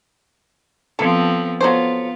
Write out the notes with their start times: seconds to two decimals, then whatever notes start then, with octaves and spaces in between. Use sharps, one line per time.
0.99 F3 B3 C4 A4
1.61 F#3 B3 F4 A4 C5